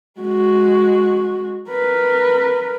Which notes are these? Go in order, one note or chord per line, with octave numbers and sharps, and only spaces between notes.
G#3 F#4
A#4 B4